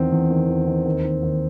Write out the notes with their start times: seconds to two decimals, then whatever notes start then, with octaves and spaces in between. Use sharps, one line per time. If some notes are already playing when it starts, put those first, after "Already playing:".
Already playing: E2 D#3 C4
0.12 E2
0.30 D#3
0.49 E2
0.67 D#3
0.85 D#2
1.04 D#3
1.23 D#2